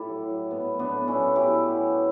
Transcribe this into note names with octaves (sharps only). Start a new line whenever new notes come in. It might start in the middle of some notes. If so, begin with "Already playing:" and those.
Already playing: A2 E4 G4 A4
F#3
F#3
A2 B3
F#3
B3 D4
A2
C#4 E4
F#3
F#3 E4 G4
F#3
F#3